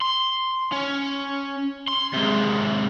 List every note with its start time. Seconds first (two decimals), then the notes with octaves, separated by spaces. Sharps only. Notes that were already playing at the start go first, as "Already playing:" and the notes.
0.02 C6
0.72 C#4
1.88 C6
2.13 C3 G#3